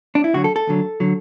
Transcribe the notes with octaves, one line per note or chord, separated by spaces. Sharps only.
D4
E4
D2 D3 F#3 F#4
A4
A4
D2 D3 F#3
D3 F#3